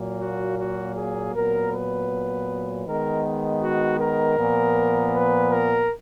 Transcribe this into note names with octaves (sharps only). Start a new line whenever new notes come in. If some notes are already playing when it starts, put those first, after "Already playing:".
Already playing: A#2 F#3 A#3
F#4
F#4
G#4
A#2 F#3 B3 A#4
B4
D#3 G#3 B3 A#4
F#4
A#4
A#2 F3 B3
B4
A#4